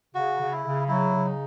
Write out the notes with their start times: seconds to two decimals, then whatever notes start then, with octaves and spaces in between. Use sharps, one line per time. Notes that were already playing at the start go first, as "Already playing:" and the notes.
0.15 C#3 F#4
0.40 C#3
0.52 E4
0.64 C#3
0.88 F#3 E4
1.13 C#3
1.25 D#4